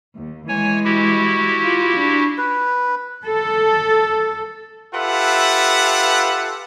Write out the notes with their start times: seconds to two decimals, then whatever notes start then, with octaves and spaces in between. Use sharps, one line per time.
0.16 D#2
0.48 E3 G#3 C#5 G#5
0.85 E4 F#4 G4
1.62 F4
1.97 D4
2.38 B4
3.24 A4
4.94 F4 G4 A4 B4 E5 F#5